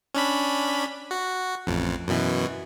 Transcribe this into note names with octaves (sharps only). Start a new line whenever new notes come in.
C#4 D4 B5
F#4
A1 F2
F#2 B2 E3